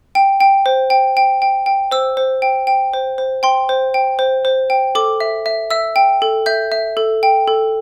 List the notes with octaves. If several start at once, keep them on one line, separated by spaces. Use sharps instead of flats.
G5
G5
C5
G5
G5
G5
G5
C5 E6
C5
G5
G5
C5
C5
G5 C6
C5
G5
C5
C5
G5
A4 D6
E5
E5
E5 E6
G5
A4
E5 G6
E5
A4
G5
A4